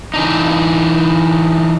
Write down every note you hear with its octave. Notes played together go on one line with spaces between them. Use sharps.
E3 D4 D#4